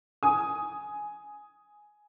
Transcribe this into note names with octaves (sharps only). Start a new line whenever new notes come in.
G#5 D#6